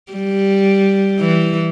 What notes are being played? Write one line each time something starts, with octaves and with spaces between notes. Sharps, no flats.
G3
E3